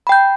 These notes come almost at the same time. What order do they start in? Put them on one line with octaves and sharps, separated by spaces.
B5 G5 G6